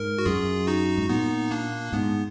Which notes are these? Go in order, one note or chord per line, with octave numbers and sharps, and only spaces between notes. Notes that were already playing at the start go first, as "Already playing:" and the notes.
Already playing: G#2 A#4
F#4
F#2 F4 G#4
D#4 F#4
G#2
A#2 B3 D#4
A#3 D4
G#2 B3